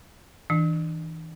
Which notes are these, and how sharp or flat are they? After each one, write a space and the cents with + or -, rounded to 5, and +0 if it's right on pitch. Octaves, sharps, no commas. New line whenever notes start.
E3 -35 D4 +20